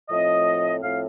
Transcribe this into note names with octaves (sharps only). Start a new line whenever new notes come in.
A2 F3 C4 D#5
A2 F3 C4 F5